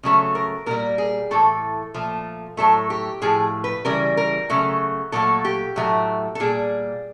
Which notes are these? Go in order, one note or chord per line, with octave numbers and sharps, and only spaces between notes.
C#3 F#3 A3
A#4
A#2 G3 A#4
G#4
A2 E3 A3 A4
A#2 F3 A3
A2 F#3 A3 A4
G4
A2 F3 A3 G#4
B4
C#3 E3 G3 A#4
A#4
C#3 F#3 A3
A#2 F#3 A3 A4
G4
A2 F#3 A3
A4
A#2 G3 G#4